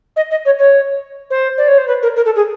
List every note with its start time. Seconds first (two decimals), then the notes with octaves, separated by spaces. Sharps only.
0.16 D#5
0.31 D#5
0.45 C#5
0.59 C#5
1.30 C5
1.58 D5
1.68 C#5
1.78 C5
1.87 B4
2.03 A#4
2.16 A#4
2.25 A4
2.36 G#4